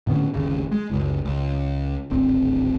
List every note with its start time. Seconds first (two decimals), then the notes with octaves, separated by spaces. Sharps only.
0.07 A2 D3 B3 C#4
0.34 G1 D#2 C#3
0.71 G#3
0.90 F#1 C#2
1.25 C#2
2.10 D1 G#1 C4